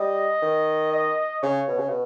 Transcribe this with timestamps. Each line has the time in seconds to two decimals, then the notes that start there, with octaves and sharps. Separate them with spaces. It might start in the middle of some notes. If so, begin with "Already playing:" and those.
Already playing: G3 D#5
0.42 D#3
0.92 D#5
1.42 C#3 C#5
1.68 B2
1.78 C#3
1.89 B2